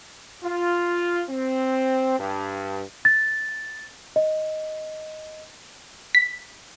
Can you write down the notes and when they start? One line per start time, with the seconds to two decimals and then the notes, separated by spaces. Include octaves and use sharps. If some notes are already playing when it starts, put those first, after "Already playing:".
0.44 F4
1.29 C4
2.19 G2
3.05 A6
4.16 D#5
6.15 B6